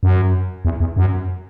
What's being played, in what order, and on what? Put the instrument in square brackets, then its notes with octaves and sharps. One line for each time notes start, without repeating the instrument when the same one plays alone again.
[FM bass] F#2
E2
E2
F#2